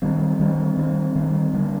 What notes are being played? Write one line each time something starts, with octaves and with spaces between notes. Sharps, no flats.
D#3 G3 C4
D#3 G3 C4
D#3 G3 C4
D#3 G3 C4
D3 G3 A#3 D4